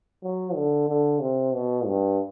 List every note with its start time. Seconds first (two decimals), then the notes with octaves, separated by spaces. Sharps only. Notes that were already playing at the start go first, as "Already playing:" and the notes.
0.23 F#3
0.56 D3
0.88 D3
1.21 C3
1.54 B2
1.86 G2